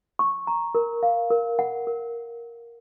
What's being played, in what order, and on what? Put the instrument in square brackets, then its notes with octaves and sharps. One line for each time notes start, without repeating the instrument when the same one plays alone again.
[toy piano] C#6
A#5
A#4
F5
A#4
F#5
A#4